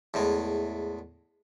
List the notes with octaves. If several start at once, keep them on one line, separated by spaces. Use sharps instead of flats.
E2 A2 G#3